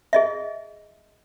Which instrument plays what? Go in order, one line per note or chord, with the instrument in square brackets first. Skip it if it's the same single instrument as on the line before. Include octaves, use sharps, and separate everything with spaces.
[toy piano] G#4 D#5 E5